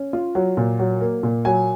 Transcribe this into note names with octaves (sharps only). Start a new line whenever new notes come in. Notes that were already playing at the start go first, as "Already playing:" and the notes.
Already playing: C#4
F4
F#3
A#2
F#3
A#3
A#2
F#3 G#5